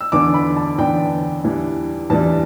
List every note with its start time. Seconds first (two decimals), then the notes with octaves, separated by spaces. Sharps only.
0.01 E6
0.12 E2 D3 B3 D4 D6
0.34 B5
0.56 A5
0.78 E2 D3 B3 D4 G5
1.44 E2 E3 G3 D4
2.10 E2 E3 G3 D4 A5